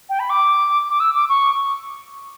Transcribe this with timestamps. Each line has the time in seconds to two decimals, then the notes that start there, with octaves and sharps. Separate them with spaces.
0.09 G5
0.19 B5
0.29 D6
0.89 D6
1.00 E6
1.14 D6
1.29 C#6